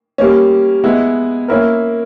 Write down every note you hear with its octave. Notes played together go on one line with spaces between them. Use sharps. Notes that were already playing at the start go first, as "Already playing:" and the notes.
G3 A#3 C#4
G#3 B3 E4
A#3 C#4 E4 A#4